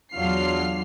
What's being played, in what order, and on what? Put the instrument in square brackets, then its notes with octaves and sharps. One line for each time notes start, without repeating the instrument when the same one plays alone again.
[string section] E2 F#3 D4 F4 F6 C7